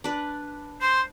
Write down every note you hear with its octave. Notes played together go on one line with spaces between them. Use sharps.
D4 B4
C5 C6